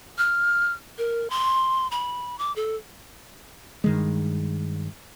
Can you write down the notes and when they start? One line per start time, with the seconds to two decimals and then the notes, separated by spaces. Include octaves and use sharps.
0.18 F6
0.98 A#4
1.30 C6
1.91 B5
2.39 D6
2.56 A4
3.84 G2 D#3 G#3